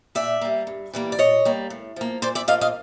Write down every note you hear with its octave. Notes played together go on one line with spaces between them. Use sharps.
A#2 D5 E5
G3 A#3
G2
E3 G3 A#3
D5
A#2 C#5 D#5
G3 A#3
A2
F3 A#3
A#2 C5 D5
D5 E5
F3 A#3 D#5 F5
D#5 F5